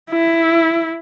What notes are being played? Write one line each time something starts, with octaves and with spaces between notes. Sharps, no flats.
E4